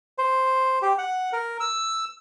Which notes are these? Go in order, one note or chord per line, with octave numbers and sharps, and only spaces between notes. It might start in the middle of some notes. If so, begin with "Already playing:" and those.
C5
G4
F#5
A#4
E6